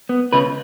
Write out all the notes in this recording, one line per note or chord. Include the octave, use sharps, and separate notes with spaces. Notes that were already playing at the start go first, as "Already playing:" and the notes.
B3
C#3 B4